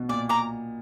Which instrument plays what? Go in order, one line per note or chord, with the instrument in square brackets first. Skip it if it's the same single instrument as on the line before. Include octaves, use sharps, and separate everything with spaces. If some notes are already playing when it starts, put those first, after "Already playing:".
Already playing: [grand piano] B2
[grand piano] A#2 [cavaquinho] D5
[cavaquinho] A#5 D6